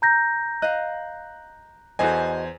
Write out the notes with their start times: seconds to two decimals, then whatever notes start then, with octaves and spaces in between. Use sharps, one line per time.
0.02 A#5 G6 A#6
0.62 D#5 F5 F#6
1.99 E2 F#4 A4 C5 D#5 G#5